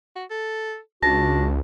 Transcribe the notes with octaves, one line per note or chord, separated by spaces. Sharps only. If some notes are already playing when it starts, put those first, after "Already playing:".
F#4
A4
C#2 D4 F#4 A5 A#6